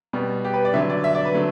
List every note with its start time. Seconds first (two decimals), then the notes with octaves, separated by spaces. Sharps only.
0.13 B2 G3 B3
0.45 G4
0.53 B4
0.65 D5
0.74 D3 F#3 B3 E5
0.90 D5
1.04 E5
1.15 D5
1.25 B4
1.34 D3 F#3 A3